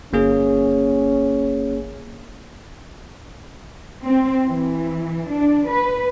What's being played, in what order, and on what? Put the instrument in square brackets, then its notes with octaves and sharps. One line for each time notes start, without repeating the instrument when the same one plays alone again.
[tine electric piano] G1 A#3 G#4 [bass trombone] C#4
[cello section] C4
E3
D4
B4